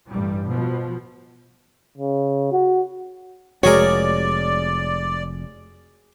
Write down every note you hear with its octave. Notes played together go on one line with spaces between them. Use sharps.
A1 G2 G3
B2 F3
C#3
F#4
F1 G#3 F#4 G#4 A#4 C#5 D5